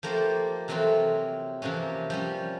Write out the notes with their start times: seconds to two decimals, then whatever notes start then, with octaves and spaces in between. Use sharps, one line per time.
0.03 F3 A3 A#3 G4 C5 D5
0.68 C3 E3 F#3 A3 C4 F4
1.62 C3 E3 F3 A#3 C#4
2.10 F3 G3 C#4